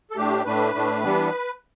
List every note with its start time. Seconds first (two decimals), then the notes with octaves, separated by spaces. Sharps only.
0.11 A4
0.16 A2 A3 D4 G4
0.45 A2 A3 D4 B4
0.74 A2 A3 D4
1.03 E3 G3 B3 D4